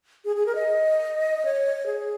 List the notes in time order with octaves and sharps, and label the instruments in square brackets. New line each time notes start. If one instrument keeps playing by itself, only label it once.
[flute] G#4
G#4
A#4
D#5
C#5
G#4